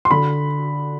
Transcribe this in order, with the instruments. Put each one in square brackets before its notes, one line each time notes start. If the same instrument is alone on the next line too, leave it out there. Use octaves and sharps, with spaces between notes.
[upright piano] C6
D3 B5